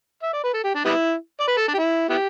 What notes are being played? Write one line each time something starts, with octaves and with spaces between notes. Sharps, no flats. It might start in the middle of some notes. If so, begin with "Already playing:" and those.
E5
D5
B4
A4
G4
D4
G3 B3 E4
D5
B4
A4
D4
G4
E4
B3 E4 G4